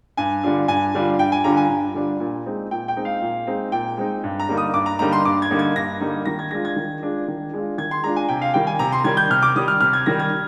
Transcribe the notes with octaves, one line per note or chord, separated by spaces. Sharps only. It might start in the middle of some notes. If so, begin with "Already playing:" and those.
G2 G#5
D3 G3 D4 F4
G2 G#5
D3 G3 D4 F4
G2 G5
G#5
D3 G3 D4 F4 A#5
G#5
G2
D3 G3 D4 F4
A#2
G#3 C4 D#4
A#2 G5
G5
G#3 C4 D#4
F5
A#2
G#3 C4 D#4
A#2 G5
G#3 C4 D#4
G2
A#5
D3 G3 A#3 D#4
D#6
G2 D6
A#5
D3 G3 A#3 D#4 A#5
C6
G2 D6
G#6
D3 G3 A#3 D#4
G#6
G2 A#6
D3 G3 A#3 D#4
D#3 A#6
G#6
G#3 D4 F4 A#6
G#6
D#3
G#3 D4 F4
D#3
G#3 D4 F4
D#3 G#6
C6
G#3 D4 F4 A#5
G#5
C3 G5
F5
D#3 G3 G5
G#5
C3 A#5
C6
D#3 G3 G#6
G6
C3 F6
D6
D#3 G3 D#6
F6
C3 F6
G#6
D#3 G3 A#6
G#6